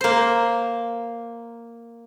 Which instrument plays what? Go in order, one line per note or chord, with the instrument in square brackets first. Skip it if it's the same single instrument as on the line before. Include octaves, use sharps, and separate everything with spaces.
[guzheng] A#3 C5